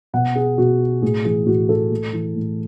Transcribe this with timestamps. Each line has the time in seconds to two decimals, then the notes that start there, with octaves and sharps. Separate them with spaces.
0.13 B2 F#5
0.35 G#4
0.58 B2 F#4
1.02 A2 G#4
1.24 E3 G#4
1.46 A2 F#4
1.69 E3 A4
1.91 A2
2.13 E3
2.36 A2